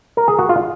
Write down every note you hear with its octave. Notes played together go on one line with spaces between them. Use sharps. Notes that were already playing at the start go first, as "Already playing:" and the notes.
A#4
G#4
F#4
F4